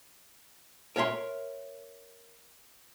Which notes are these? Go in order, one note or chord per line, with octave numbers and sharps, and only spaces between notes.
A#4 C#5 E5 F#5 C6